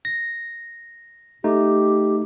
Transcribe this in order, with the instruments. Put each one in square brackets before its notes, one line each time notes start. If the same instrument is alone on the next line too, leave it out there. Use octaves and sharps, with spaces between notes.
[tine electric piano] A#6
[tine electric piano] A3 D#4 [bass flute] G4